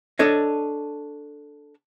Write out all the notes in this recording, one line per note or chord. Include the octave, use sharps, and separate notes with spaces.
D4 A4 C#5 D#5